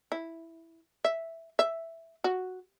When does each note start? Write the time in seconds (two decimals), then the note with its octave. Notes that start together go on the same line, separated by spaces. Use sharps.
0.12 E4
1.05 E5
1.59 E5
2.24 F#4